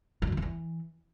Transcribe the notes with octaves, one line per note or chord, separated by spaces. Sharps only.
F2
F#2
D#3
E2
E3